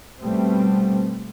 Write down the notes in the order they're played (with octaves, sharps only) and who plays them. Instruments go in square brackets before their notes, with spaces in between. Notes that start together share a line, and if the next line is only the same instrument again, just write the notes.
[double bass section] B2 G3 A3 B3 C4